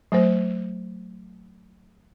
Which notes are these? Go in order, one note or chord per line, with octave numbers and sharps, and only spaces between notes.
F#3 A3 C5